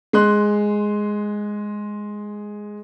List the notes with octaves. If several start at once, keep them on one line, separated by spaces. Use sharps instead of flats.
G#3 C6 F#6